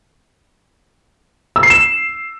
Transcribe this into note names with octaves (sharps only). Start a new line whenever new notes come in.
E6
C7
E7